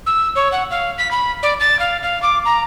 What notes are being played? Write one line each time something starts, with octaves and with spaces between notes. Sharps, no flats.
E6
C#5
F#5
F5
B6
B5
D5
A6
F5
F5
D6
A#5